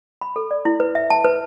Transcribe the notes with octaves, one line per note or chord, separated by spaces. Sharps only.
B5
A4
D5
E4
B4
E5
A5
B4